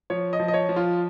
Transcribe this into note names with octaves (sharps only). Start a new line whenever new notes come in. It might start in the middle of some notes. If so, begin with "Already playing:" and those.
F3 C#5
D#5
F3
D#5
C#5
F3
F4